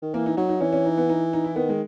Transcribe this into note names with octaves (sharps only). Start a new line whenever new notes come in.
D#3
E3 A#3
D#4
F#3 D#4
D#4
E3 C#4
C#4
D#4
B3
D#4
D#4
E4
D#3 B3
G#3